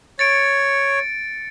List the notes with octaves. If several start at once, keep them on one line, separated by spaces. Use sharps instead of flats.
C#5 A6 C#7 D7